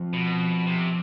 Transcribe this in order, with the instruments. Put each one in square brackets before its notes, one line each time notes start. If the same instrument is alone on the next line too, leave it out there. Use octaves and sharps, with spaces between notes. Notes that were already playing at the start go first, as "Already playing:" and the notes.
Already playing: [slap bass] F3 C4
[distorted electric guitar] B2
C3